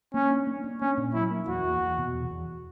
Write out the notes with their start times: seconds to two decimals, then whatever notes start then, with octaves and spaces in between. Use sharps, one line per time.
0.14 A#3 C#4
0.31 D4
0.47 A#3
0.64 D4
0.81 A#3 C#4
0.97 A#2
1.14 F#3 E4
1.30 A#3
1.47 E2 F#4
1.64 E2
1.81 E2
1.98 B2
2.14 E2
2.31 E2